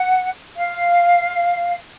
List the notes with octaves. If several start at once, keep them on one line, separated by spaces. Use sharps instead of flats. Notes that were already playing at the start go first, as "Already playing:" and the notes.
Already playing: F#5
F5